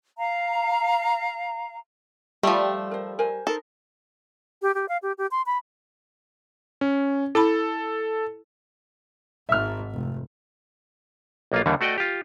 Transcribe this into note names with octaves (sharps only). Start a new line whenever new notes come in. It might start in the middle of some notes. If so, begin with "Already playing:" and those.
F5 A#5
F3 G3 A3 D5
A#4 C5
A#4 C5 G#5
D#4 A4 A#4 C5
G4
G4
F5
G4
G4
C6
B5
C#4
E4 A4 A5 B5
G#1 G#2 E5 F6
F1
B1 A#3 F4
D#2 D3 E3 G3
A3 F#4 D5 D#5 G5
F4 G4